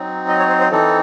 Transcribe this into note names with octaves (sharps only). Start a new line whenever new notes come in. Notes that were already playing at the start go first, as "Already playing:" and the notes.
Already playing: F#3 C4 D#4
D#5
C#5
C5
C5
E3 C4 D#4 A4